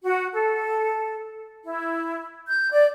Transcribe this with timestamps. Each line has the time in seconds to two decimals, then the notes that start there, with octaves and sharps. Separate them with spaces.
0.04 F#4
0.33 A4
1.64 E4
2.48 G6
2.72 D5